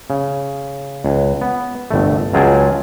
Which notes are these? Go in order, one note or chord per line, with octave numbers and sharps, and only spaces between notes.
C#3
C#2
B3
G1 C2 A3
C#2 F#3 F4 G#4 G5 A5